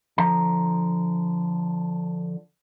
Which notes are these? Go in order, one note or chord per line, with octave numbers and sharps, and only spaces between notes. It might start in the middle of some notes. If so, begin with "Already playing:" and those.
D3 F3 A#5